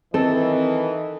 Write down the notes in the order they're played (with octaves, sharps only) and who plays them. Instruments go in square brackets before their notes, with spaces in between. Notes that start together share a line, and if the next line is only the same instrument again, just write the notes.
[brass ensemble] D#3 E3 [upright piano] C4 [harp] A4 [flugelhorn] D#5